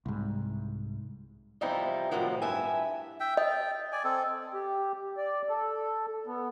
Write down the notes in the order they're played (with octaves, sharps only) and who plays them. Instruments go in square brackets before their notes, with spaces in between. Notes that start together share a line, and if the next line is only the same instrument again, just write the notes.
[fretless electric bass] C2 G#2
[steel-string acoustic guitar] E2 C3 F3 G3 D#4 E4
A2 C3 D#3 F3 F#3
G2 E4 E5 G#5
[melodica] E5 G5
[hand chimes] D#5 [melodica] G5
[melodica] D5 G#5
C4 A4
[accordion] G4
D5
A4
B3